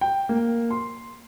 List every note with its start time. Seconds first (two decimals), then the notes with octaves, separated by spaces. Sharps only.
0.01 G5
0.29 A#3
0.71 C6